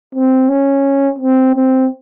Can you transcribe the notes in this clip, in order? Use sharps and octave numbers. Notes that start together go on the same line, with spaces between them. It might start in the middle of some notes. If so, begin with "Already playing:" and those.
C4
C#4
C4
C4